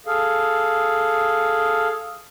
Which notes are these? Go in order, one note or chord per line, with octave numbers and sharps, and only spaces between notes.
G#4 A4 F5